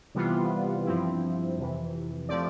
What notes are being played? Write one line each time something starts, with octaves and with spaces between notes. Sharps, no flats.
C3 E3 G3 B3 F4
G2 F3 C4 E4
F2 C3 E3
F3 A3 C4 G4 D5